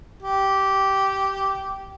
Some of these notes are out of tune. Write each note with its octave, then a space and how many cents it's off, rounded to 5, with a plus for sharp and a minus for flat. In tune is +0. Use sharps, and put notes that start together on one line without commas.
G4 -10